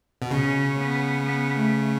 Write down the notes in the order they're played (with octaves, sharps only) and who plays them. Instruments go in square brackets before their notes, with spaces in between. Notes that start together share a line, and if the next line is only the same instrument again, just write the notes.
[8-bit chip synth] B2
[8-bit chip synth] C#3 [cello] C#4
[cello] B3
B3
A3